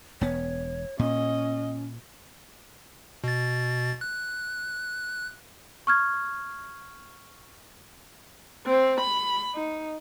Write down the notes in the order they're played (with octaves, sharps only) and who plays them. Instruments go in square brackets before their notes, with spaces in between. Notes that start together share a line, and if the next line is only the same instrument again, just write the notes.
[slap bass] E1 B3 [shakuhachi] C#5
[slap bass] A#2 [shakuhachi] C#4 [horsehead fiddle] D#5
[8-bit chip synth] B2 A6
F#6
[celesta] C#6 F6 G#6
[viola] C4
B5
D#4